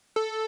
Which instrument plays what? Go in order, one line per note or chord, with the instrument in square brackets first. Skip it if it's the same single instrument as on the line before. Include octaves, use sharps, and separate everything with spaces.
[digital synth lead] A4